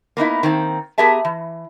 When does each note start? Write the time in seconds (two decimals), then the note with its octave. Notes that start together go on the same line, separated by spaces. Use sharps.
0.17 A#3 B3 D#4 E4
0.43 D#3 A#3 C4
0.98 B3 G4 G#4 A#4 E5 A5
1.25 E3